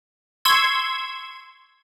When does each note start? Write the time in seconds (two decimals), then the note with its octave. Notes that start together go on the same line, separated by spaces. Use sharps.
0.45 C6 C#6 E6 G#6